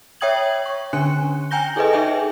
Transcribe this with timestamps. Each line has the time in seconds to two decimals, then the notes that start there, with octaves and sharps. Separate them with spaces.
0.21 C#5 E5 G5 D#6 G#6 F#7
0.66 C#6
0.93 D3 C#4 D4 G#5 F#6 C#7
1.51 G5 G#5 A#5 G6 A#6 G7
1.76 E4 G#4 A4 B4 D#5
1.92 D#4 G#4 E5 G5 G#5